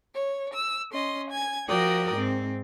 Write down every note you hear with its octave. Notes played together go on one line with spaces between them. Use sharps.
C#5
E6
C#4 D#5 C6
G#5 G#6
F3 F#4 A#4 D5 G5 D#6
G#2 C4